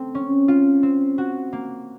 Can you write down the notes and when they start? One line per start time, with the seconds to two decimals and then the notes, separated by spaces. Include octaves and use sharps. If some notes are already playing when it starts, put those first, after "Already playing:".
Already playing: A3 C4
0.15 C#4
0.48 F4
0.83 C4
1.18 F#4
1.53 A#3